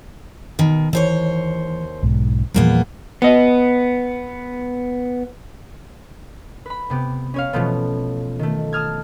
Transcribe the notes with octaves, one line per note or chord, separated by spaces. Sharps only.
B2 D#3
D#2 E3 C5 C#5
B1 G#2
E2 A#2 F3 G3 A#3 B3
B3 D#5
B4 B5
C3 B3 G4
C#4 C#5 F5
B2 E3 F3 A3 B3
D#3 A3
A5 D#6 F6 G#6